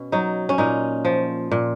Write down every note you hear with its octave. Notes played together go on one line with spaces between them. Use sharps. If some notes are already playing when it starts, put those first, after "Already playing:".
Already playing: B2 C#4
F#3 D#4
C#4
A#2 D#4
F3
A#2